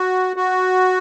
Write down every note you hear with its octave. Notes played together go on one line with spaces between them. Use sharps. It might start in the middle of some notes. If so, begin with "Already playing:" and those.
Already playing: F#4
F#4